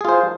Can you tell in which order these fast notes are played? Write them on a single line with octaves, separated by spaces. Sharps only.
G#4 F4 C5